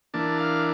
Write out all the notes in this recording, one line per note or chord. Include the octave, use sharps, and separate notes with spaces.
E3 A#3 D4 A5
F5